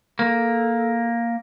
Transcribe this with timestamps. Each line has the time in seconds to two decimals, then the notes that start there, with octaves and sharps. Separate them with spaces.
0.19 A#3 A4